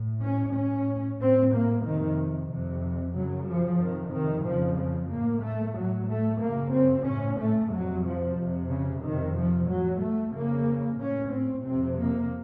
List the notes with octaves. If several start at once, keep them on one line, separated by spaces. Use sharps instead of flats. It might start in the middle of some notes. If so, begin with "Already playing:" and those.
Already playing: A2
C#4
A2 C#4
A2 C4
A#3
F2 C3 D#3
F2 C3
F#2 C#3 F#3
F3
F2 C3 D#3
D#3
F2 C#3 F3
F3
A2 A#3
A3
A2 F#3
A3
F#2 C#3 A#3
C4
A2 C#4
A3
F2 C3 F#3
F3
F2 C3
C#3
F2 C3 D#3
F3
A2 F#3
A3
F2 C#3 A#3
A2 C#4
C4
F2 C3 C4
A#3